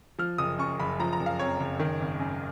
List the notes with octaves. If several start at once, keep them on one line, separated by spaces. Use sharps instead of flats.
F3 F6
F#1 D#6
F#2 C#6
F#1 B5
F3 A#5
A#5
F#1
F5
F2 C#5
F#1
D#3
G#1
F#2